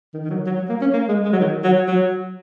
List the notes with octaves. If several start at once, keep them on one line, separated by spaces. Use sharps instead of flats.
D#3
D#3
F#3
F#3
F#3
A#3
C#4
A#3
G#3
G#3
F#3
D#3
F#3
F#3